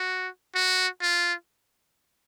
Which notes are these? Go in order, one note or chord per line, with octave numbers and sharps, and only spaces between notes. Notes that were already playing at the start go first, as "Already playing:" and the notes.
Already playing: F#4
F#4
F4